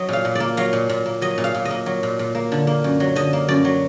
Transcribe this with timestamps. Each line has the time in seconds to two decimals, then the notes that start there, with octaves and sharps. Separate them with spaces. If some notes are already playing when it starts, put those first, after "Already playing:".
Already playing: F#3 D#5
0.08 A#2 F5
0.25 A#2
0.35 A#3 D5
0.57 F#3 F5
0.73 A#2
0.89 A#2
1.06 A#3
1.22 F#3 D#5
1.38 A#2
1.44 F5
1.55 A#2
1.65 A#3 D#5
1.86 F#3
2.03 A#2
2.19 A#2
2.35 A#3
2.52 D3
2.67 A#3
2.84 F#2
3.00 F#3
3.15 D3 D#5
3.33 A#3
3.48 F#2 D5
3.65 F#3